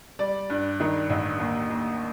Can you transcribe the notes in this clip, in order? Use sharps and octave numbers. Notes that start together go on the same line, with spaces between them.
G3 D5
G2
D#3
A1
D#2
D#2